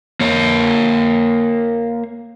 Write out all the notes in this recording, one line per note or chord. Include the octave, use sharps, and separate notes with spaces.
A#3 C#5